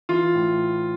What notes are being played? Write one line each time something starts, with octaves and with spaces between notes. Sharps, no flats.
E3 F4
A2